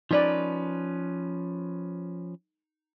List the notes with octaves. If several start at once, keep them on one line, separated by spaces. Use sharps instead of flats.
F3 C#4 D#4 B4 D5